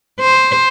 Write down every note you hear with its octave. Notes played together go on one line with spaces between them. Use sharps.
C5